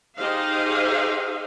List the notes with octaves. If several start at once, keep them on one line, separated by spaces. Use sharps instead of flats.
D#4 G4 G#4 C5 D#5 F5